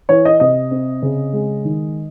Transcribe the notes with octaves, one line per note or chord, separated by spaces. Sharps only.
E3 C#5
D#5
C3 D#5
C4
C#3
G#3
D#3